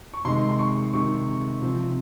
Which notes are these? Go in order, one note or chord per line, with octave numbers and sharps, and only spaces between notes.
C#6
C3 D#3 G#3 C6
C6
C#6
C3 D#3 G#3 C#6
C3 F3 C4